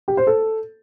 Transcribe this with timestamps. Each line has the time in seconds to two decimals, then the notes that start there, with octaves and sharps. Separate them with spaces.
0.08 G4
0.17 C5
0.27 A4